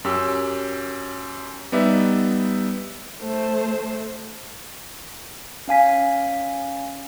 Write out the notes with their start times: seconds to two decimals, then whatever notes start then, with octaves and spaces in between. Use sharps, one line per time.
0.04 F#2 C#4 G4 E6
1.72 G3 B3 D#4 D5 E5
3.21 A3 C5
5.68 C#4 F5 G#5 B6